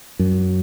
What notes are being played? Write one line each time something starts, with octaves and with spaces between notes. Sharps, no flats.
F#2